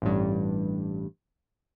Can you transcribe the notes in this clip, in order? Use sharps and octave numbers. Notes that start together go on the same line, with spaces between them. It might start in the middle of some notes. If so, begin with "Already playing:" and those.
A1 G2